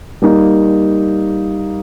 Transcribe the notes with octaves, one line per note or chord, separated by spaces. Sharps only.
G3 A#3 D#4